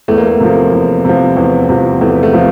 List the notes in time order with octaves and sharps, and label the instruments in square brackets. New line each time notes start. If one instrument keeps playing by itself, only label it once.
[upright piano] E2 A3
A#3
A3
C3 F3
E2
C3 F3
E2
C3 F3
E2 A3
A3
C3 F3